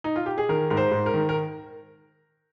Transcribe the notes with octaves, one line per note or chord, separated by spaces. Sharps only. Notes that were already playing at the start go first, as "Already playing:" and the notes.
D#4
F4
G4
G#4
D#3 A#4
G#2 A#4
C5
G#2
A#4
D#3
A#4